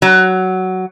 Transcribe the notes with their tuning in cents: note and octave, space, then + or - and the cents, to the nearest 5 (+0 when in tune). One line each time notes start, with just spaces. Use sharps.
F#3 +10